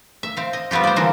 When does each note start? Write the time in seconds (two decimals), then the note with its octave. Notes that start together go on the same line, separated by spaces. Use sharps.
0.23 E5
0.37 C4 F5
0.53 D#5
0.71 G3 B3 C4 F4 G4
0.84 C5 D5
0.96 D3 E3 A#3 C4 D#5